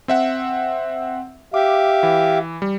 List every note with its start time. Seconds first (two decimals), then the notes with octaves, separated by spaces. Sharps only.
0.08 C4 E5 F#5
1.54 G4 E5 F5 D6
2.03 E3
2.62 G3